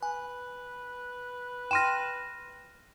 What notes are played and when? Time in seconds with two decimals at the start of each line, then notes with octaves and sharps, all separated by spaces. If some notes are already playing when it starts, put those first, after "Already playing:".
0.03 B4 G#5
1.71 G5 C6 F6 A#6 D#7 E7